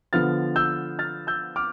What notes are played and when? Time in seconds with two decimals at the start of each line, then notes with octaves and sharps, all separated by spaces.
0.13 D3 F3 B3 F6 A6
0.56 E6 G6
0.99 F6 A6
1.27 E6 G6
1.56 D6 F6